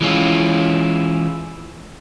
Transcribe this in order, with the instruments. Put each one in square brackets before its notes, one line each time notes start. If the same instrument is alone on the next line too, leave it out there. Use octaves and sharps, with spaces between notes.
[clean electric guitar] E3 G#3 C#4 E4 F4